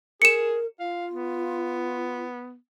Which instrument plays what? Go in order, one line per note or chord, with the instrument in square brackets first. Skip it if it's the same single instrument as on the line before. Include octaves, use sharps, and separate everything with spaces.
[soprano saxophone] G#4 [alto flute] A#4 [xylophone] C#7 E7
[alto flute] F4 [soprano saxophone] F5
[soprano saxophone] B3